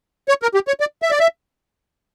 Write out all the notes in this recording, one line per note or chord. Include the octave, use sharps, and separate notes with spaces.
C#5
A#4
G4
C#5
D5
E5
D5
E5